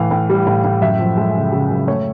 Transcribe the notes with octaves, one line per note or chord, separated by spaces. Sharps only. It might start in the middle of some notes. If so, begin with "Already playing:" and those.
Already playing: A2 E3 F5
A2
G3
A2
A2
F#2 E5
F3
G#3
C#3
C#3
F#2
A3 C#5